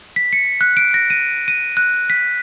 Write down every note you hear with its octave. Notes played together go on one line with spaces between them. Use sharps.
B6
C#7
F#6
D7
A#6
D#7
D#7
F#6
B6